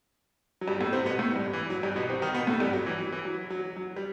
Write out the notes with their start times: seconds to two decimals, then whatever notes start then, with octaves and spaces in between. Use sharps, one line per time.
0.61 F#3
0.67 G2 G3
0.80 A2 A3
0.93 C3 C4
1.05 B2 B3
1.19 A2 A3
1.36 G2 G3
1.53 E3
1.70 F#3
1.83 G2 G3
1.96 B2 B3
2.09 C3 C4
2.22 D#3 D#4
2.34 B2 B3
2.47 A2 A3
2.60 G2 G3
2.73 F#3
2.86 E3
2.99 F#3
3.12 E3
3.25 F#3
3.50 F#3
3.76 F#3
3.96 G3